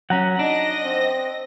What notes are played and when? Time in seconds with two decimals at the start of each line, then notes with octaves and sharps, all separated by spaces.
0.10 F#3 C#4 F#5 A#5
0.39 D4 D#4 D#5 A#6
0.83 C4